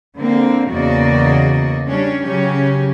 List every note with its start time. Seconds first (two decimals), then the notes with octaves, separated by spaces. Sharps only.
0.17 D3 A#3 C4
0.71 E2 C#3 A#3 F#4 D5 D#5
1.86 G3 C#4 D4
2.26 C#3 F#3 C#4 G4